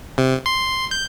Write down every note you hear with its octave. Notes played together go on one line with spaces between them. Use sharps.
C3
C6
G6